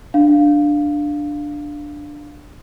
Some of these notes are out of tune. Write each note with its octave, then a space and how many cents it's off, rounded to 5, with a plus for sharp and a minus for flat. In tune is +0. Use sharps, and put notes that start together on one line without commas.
D4 +0 F5 +0